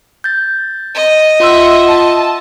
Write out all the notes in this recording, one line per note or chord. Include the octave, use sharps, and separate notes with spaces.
G6 A6
D#5
F4 E5 F#5 C6 E6
A5